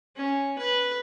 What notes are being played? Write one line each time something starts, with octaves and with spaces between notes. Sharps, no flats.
C#4
B4